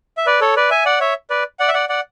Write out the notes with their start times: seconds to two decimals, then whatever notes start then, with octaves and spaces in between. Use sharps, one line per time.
0.17 E5
0.26 B4 D5
0.41 A4 C#5
0.56 B4 D5
0.70 E5 G#5
0.85 D5 F#5
1.00 C#5 E5
1.30 B4 D5
1.59 D5 F#5
1.68 E5
1.74 D5 F#5
1.89 D5 F#5